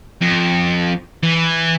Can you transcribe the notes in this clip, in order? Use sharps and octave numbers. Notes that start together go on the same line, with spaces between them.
F2
E3